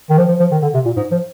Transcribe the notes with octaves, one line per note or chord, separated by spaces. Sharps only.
D#3
F3
F3
F3
D#3
D3
C3
A#2
G#2
F3